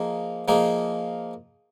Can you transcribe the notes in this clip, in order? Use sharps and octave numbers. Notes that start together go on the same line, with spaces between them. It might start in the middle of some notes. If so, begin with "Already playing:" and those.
Already playing: F3 A#3 D#4 G#4
F3 A#3 D#4 G#4